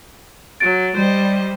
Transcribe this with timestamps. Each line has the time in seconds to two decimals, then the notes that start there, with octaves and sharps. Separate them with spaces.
0.60 F#3 A6 D7
0.96 G3 C5 D#5